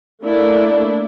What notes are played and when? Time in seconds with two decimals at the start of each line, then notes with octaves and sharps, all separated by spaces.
0.22 A3 A#3 D4 E4